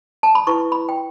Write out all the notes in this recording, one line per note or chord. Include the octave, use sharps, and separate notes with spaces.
A5
B5
E4 B4 C#6
B5
G5